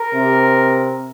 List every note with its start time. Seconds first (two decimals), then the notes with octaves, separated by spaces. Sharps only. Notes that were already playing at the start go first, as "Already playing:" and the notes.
Already playing: A#4
0.14 C3